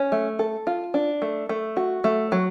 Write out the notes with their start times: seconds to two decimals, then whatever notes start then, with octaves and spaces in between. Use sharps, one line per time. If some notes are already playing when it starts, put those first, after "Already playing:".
Already playing: C#4
0.12 A3
0.39 A4
0.67 F4
0.94 D4
1.22 A3
1.49 A3
1.77 F#4
2.04 A3
2.32 F#3